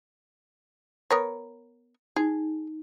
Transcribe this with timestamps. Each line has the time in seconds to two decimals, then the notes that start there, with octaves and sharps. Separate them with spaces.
1.11 B3 A#4 C#5
2.16 D#4 G#4